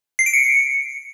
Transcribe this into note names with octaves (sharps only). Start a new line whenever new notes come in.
C7
D7
C#7